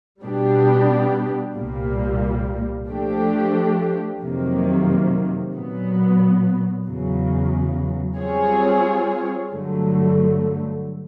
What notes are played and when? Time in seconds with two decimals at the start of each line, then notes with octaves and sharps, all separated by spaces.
0.23 B2 G3 B3 D4 G4
1.56 C2 A#2 G3 A#3
2.88 F3 A3 D4 G4
4.21 F2 C3 D#3 F#3 A#3
5.54 A#2 F#3 B3
6.86 E2 C#3 F#3
8.19 G3 C4 F4 G#4 C#5
9.52 G2 D3 F#3 A3